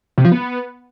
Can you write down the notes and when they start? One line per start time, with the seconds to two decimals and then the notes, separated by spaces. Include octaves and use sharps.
0.18 C3
0.25 F3
0.32 B3